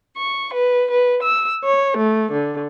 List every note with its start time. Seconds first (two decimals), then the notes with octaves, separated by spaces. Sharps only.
0.16 C#6
0.53 B4
0.89 B4
1.22 E6
1.64 C#5
1.97 A3
2.31 D3